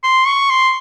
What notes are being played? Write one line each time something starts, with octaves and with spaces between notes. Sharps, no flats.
C6
C#6
C6